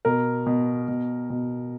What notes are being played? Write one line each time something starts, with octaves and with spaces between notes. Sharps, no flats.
B2 A#4
B2
B2
B2